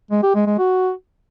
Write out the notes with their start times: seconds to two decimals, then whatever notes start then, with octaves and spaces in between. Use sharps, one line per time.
0.11 G#3
0.23 G4
0.35 G#3
0.47 G#3
0.58 F#4